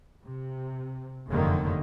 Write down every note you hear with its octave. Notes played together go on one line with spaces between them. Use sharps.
C3
F1 F#2 D3 D#3 A#3